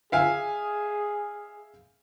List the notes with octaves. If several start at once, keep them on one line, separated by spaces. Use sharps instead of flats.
G#4 E5 F5 G#5